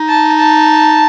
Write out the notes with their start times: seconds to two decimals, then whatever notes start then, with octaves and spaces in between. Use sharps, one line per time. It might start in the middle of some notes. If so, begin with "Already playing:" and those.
Already playing: D#4
0.09 A5
0.40 A5